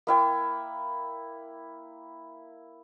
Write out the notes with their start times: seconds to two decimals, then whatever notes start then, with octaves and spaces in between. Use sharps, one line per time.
0.07 A#3 E4 G5